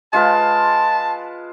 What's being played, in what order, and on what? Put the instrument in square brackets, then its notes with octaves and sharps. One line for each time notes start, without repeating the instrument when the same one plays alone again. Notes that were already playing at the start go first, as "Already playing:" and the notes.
[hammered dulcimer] G#3 F4 B4 [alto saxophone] A5